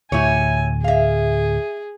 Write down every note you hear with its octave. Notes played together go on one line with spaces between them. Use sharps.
D2 A2 E4 G4 C#5 G#5
G#4 E5 F5